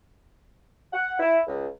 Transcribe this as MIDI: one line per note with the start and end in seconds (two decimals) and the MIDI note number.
0.93 1.15 78
1.20 1.39 64
1.47 1.66 37